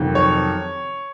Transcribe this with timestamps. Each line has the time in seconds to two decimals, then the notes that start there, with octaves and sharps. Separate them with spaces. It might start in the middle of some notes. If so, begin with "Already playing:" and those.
Already playing: F2 C3 D#3 F#3
0.15 C#5